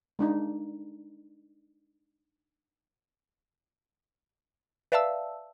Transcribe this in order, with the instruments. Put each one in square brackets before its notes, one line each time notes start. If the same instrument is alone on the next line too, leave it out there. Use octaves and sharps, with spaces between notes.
[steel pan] G#3 D4 D#4
[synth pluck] B4 D5 E5 F5 A5 E6